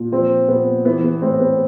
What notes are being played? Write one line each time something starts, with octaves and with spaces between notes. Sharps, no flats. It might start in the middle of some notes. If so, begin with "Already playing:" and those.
Already playing: A#2
F3 C4
A#2 B3
E3 B3
B3
A2 C4
B3